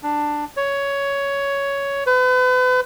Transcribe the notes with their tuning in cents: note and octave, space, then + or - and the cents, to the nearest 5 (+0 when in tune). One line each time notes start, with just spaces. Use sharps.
D4 +10
C#5 +10
B4 +40